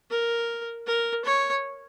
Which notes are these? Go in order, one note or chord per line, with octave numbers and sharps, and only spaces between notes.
A#4
A#4
C#5